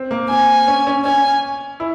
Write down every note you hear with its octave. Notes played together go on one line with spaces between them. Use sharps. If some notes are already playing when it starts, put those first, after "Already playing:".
Already playing: C4
A#3
C4 G#5
C#4
C#4
C#4 G#5
E4